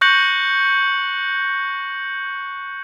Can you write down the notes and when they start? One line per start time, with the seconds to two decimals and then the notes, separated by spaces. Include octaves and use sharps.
0.01 C#6 F#6 G6 A#6 C#7 F#7